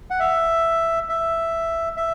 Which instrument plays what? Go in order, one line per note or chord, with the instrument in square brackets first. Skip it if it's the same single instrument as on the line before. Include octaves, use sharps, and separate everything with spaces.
[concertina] F#5
E5
E5
E5